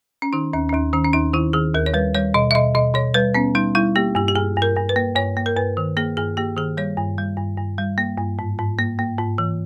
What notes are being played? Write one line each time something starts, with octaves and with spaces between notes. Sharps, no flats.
C#4
D#3 D#4
D#2 C#4
C#4
D#2 D#4
D#3 C#4
C#4
D#2 D#4
D#3 E4
D#3 G#4
D#2 A#4
C#5
G3 B4
G3 C#5
B2 D#5
E5
B2 D#5
B2 D#5
B2 C#5
G3 B4
B3 C#4
G3 D#4
G3 E4
A#3 G4
G2 G4
G4
G2 G#4
G2
A#4
G2
B4
A#3
G2 C#5
A#3
A#4
G2 B4
D#3
A#3 G#4
G2 G#4
A#3 G4
D#3 G#4
G3 C#5
G2
G3
G2
G2
G3
A#3
G2
G#2
G#2
A#3
A#3
G#2
E3